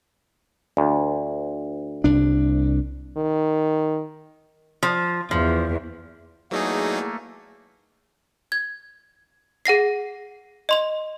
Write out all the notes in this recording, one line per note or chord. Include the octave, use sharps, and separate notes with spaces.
D2
C2 D4
D#3
F3
E2 F3
E2 F#3 A3 A#3 D#4 G#4
G#6
G#4 F#5 A#6 C7
D#5 C6 F7